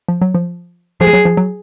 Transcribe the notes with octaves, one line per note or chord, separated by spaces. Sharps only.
F3
F#3
F3
F3 G#4
F#3
F3
F#3